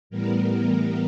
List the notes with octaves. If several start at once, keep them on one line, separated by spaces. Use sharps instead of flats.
A2 E3 G3 B3 A#4